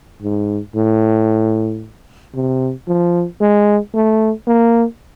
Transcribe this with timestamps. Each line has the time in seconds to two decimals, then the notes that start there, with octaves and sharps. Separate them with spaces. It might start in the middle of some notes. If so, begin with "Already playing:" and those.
0.22 G#2
0.76 A2
2.35 C3
2.88 F3
3.41 G#3
3.94 A3
4.47 A#3